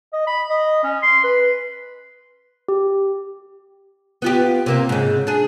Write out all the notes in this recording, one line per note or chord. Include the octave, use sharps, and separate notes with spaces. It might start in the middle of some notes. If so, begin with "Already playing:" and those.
D#5
B5
D#5
C#4
C6
B4
G4
B3 F4 G4
C3 A#3 C4
G#2 C#3
D4 G#4